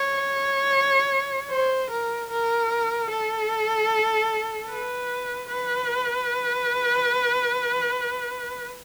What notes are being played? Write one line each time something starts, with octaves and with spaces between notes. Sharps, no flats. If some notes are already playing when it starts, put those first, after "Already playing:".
Already playing: C#5
C5
A#4
A#4
A4
B4
B4